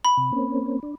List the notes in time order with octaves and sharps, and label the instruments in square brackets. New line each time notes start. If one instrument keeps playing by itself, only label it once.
[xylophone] B5
[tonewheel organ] C3
A#3 C4 C#4
D4